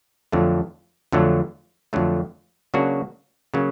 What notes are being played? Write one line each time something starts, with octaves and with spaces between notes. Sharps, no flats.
F2 D3 F#3 A3
F2 D3 F#3 A3
F2 D3 F#3 A3
C#3 F#3 A#3 D4 F#4
C#3 F#3 A#3